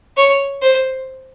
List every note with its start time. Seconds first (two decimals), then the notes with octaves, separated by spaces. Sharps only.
0.17 C#5
0.62 C5